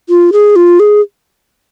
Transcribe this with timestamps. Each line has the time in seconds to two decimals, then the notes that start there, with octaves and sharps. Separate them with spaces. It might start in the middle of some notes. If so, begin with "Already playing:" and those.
0.09 F4
0.33 G#4
0.56 F4
0.80 G#4